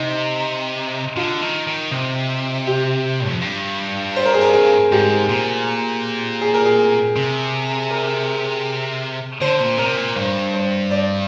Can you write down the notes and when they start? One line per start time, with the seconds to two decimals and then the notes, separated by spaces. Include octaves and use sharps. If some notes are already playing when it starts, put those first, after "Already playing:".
Already playing: C3 D#4
1.17 D3 F4
1.42 D#3
1.67 D#3
1.91 C3
2.67 G4
3.28 F2
3.42 G2
4.16 C5
4.26 A#4
4.34 G#4
4.41 A#4
4.53 G#4
4.92 G#2 G4
5.29 A#2
6.41 G#4
6.54 A#4
6.65 G#4
7.16 C3
7.91 A#4
9.41 D3 C5
9.60 A#2
9.78 C3 A#4
9.97 A#2
10.16 G2 C5
10.54 C5
10.91 D5